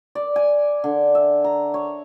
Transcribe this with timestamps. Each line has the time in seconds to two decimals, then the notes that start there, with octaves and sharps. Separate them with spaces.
0.15 D5
0.36 G#5
0.84 D3
1.15 E5
1.44 A#5
1.74 C#5